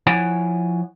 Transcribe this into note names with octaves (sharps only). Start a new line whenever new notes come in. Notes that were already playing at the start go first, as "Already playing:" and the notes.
F3 E4 C#5 F#5 G#5